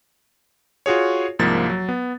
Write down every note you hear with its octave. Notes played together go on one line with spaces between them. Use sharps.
F4 F#4 G#4 C#5
C2 G#2 F3 A#3 A6
F#3
B3